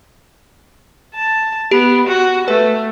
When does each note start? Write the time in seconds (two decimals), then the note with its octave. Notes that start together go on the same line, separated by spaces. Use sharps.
1.15 A5
1.71 B3 G4 D7
2.07 F#4
2.48 A3 B4